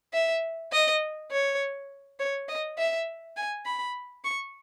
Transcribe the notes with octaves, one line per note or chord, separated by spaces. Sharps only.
E5
D#5
C#5
C#5
D#5
E5
G#5
B5
C#6